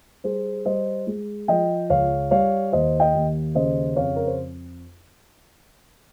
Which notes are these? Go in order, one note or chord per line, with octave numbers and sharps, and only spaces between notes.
G3 G#4 C5
G3 C5 D#5
G#3
F3 D#5 G5
C#2 C#5 F5
G3 C#5 F5
D#2 C5 D#5
D#5 G5
D#2
C#3 C5 D#5
F2 C#5 F5
A#4
C5